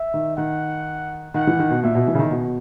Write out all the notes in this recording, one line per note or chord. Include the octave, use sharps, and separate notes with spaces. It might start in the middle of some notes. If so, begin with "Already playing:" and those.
Already playing: E5
D#3
D#3 F#5
D#3 F#5
E3
D#3
B2
A#2 E5
B2
E3
C#3
D#3
B2